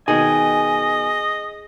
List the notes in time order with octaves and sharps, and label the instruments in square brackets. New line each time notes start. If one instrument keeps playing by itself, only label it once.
[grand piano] B2 D#3 [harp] G#4 [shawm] D#5 [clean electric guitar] G#5